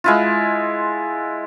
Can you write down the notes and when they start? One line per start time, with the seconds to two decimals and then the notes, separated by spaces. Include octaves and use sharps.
0.04 G#3 E4 F4